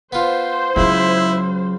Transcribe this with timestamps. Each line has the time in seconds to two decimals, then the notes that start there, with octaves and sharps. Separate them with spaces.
0.13 B3 F4 C5
0.76 C#2 F#3 C#4 E4